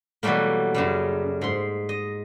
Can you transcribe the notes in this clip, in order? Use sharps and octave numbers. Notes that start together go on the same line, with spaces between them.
B2 E3 F#3 G3 A3 A#3
F#2 C#3 G3
G#2 C6
D#5